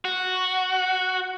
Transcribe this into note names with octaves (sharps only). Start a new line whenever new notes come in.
F#4